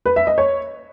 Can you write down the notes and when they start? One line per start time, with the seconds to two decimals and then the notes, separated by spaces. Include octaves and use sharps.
0.06 B4
0.16 E5
0.27 D#5
0.38 C#5